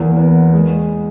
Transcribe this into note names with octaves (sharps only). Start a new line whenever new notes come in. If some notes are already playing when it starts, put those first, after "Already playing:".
Already playing: E2 A#3
B3
G#3